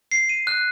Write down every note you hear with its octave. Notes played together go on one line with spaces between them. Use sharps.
C7
D#7
F#6